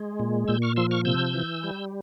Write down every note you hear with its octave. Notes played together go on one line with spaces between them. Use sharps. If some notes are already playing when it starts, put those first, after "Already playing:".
Already playing: G#3
A#2
A#2 E6 G6
C#6 F6
F3 C6 E6
C#6 F6
C3 E6 G6
E3
G3